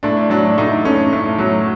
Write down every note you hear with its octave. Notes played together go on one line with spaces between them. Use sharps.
A2 D4
F#3 D4
A2 D#4
A3 C#4
A2
F#3